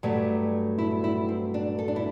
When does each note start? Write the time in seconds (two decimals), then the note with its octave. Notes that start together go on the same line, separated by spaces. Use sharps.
0.03 G2 F#3 A3 D5
0.78 E4
1.04 E4
1.29 C4
1.54 D4
1.79 A4
1.88 D4
1.96 E4